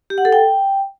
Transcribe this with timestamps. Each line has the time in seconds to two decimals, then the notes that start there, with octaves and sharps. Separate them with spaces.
0.10 G4
0.18 F#5
0.25 A4
0.33 G5